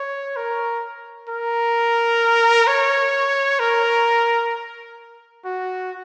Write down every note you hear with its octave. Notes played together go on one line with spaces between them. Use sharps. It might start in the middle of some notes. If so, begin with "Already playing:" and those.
Already playing: C#5
A#4
A#4
C#5
A#4
F#4